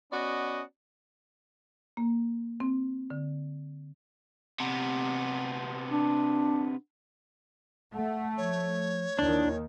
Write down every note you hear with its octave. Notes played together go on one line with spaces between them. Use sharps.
B3 C#4 F#4 D5 D#5
A#3
C4
D3
C3 B3
D4
A3 F#5
F3 C#5
D#2 D#3 D4 E4